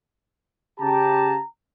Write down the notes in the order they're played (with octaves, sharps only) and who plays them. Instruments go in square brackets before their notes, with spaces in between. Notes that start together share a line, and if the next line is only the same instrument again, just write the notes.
[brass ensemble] C#3 G4 A5 [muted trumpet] A#5